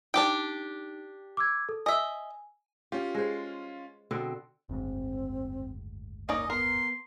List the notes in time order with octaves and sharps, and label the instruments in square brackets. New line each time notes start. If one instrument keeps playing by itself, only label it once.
[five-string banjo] D4 G4 G5 [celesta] D#4 D7
[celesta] D6 E6 G#6
A4
[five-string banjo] D#5 E5 [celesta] G#5
[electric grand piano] C#4 F4 [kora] G4
[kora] G#3 C5
B2 D3 C4
[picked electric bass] F#1 D2 G#2 [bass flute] C4
[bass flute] A#3 [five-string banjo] C#4 D#4 D5 [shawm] D#5
[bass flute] B3 [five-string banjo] A#4 [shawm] C6